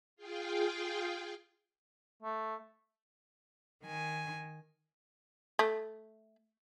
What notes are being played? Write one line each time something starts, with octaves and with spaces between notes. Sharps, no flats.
F4 G#4 F5 G5
A3
D#3 G#5
A3